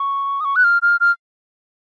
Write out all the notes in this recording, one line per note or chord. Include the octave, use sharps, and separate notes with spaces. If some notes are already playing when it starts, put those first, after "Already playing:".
Already playing: C#6
D#6
C#6
F#6
F6
F6
F6